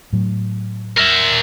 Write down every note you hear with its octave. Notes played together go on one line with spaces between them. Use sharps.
A2 F#3
A#4 E5